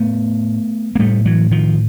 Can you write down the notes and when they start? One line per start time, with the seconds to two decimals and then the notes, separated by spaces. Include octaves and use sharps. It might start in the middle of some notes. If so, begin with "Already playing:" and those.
Already playing: A2 A3 B3
0.95 A#3
0.99 A2 G3 A3
1.25 E3 F#3
1.51 D#3 F3